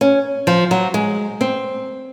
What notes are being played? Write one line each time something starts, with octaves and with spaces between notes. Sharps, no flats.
C#4
F3
F#3
G#3
C4